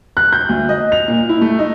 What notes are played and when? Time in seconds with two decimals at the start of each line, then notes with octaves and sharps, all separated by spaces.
0.17 F#6
0.33 G6
0.49 D2
0.69 D#5
0.92 F7
1.08 A#2
1.29 E4
1.41 A3
1.59 D#4